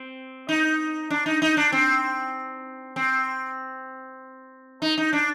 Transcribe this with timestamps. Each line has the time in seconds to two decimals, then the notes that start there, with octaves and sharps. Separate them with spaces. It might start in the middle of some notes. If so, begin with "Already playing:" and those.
Already playing: C4
0.49 D#4
1.10 D4
1.26 D#4
1.42 D#4
1.57 D4
1.72 C4
2.96 C4
4.82 D#4
4.98 D#4
5.13 D4